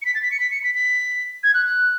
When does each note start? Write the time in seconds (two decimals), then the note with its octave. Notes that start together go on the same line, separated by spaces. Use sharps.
0.02 C#7
0.05 B6
0.15 A6
0.23 B6
0.31 C#7
0.40 B6
0.51 C#7
0.64 B6
0.75 B6
1.43 G#6
1.54 F#6
1.66 F#6